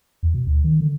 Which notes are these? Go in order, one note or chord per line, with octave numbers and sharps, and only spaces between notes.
E2
B2
D2
D#3
D3